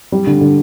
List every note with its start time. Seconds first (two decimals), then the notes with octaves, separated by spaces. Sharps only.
0.12 G3
0.27 D3
0.41 D3